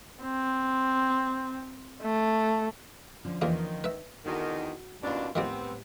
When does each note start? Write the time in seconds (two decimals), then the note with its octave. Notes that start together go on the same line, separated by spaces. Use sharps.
0.22 C4
2.02 A3
3.25 D3 F3 C#4
3.42 E2 A#2 D#3 A#3
3.84 B4 E5
4.26 E2 D3 D#3 F#4
5.03 D#2 B2 C#4 D4 F4
5.35 A2 D#3 F3 G3 B3 C4 G4